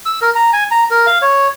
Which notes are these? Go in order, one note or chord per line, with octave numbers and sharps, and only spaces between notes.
E6
A#4
A#5
G#5
A#5
A#4
F5
C#5